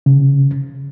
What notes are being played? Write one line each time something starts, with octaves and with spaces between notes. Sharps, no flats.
C#3